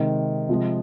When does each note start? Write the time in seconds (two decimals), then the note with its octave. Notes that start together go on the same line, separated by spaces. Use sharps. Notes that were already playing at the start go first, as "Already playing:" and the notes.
Already playing: C3 D#3 G#3
0.49 C3 F3 G#3